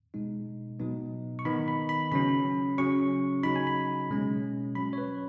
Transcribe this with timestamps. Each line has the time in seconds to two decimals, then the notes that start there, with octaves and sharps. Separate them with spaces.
0.14 B2 G#3 D#4
0.80 B2 F#3 B3 D#4
1.39 C#6
1.45 D#3 B3 D#4 B5
1.68 B5
1.89 B5
2.12 C#3 F#3 C#4 B5
2.78 C#3 F#3 C#4 C#6
3.43 C#3 F#3 D#4 B5
3.56 G#5
3.67 B5
4.10 B2 G#3 C#4
4.75 F#3 C#4 B5
4.93 C#5
4.98 B4